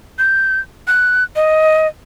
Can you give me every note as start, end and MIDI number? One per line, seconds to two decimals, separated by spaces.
0.19 0.60 91
0.87 1.24 90
1.36 1.87 75